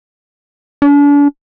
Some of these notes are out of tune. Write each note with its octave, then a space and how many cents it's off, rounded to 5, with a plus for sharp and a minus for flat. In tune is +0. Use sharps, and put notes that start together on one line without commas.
D4 -40